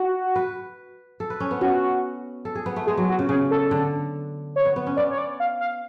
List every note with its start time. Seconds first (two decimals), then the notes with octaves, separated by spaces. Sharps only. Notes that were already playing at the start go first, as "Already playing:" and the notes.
Already playing: F#4
0.36 B4
1.20 A4
1.30 B4
1.40 C#4
1.51 B3
1.61 C#4 F#4
2.45 A4
2.55 G#4
2.66 B3
2.76 A3
2.87 G#3 G#4
2.97 F#3
3.09 F#4
3.19 C#3
3.29 C#3 G#4
3.51 A4
3.71 D3
4.56 C#5
4.65 B3
4.76 B3
4.87 C#4
4.97 B3 D5
5.10 C#5
5.18 D5
5.40 F5
5.60 F5